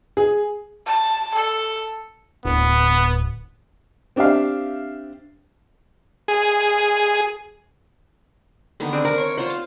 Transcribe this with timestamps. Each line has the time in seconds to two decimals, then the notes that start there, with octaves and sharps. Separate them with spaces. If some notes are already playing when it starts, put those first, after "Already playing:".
0.17 G#4
0.87 A5
1.34 A4
2.45 D1 B3
4.16 C4 D4 G4 E5 F5
6.28 G#4
8.80 D3 D#3 B3
8.93 C4 D4 G#4
9.05 C4 A#4
9.18 C#5
9.38 F4 C5 F#5
9.50 F5